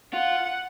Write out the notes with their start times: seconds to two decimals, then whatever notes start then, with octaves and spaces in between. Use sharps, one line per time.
0.13 F4 F#5